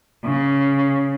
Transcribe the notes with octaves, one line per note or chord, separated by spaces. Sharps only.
C#3